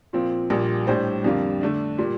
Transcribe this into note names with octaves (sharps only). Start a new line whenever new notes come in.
A#2 F3 C4
A#1 A#2 G3
A2 G3 D4 G4 C5
F2 D3 G3 A#3 F4
D3 A3 D4
A#2 G3